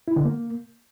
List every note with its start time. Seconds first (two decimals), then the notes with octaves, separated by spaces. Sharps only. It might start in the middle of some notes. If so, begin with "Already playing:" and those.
0.08 E4
0.16 D3
0.25 A#3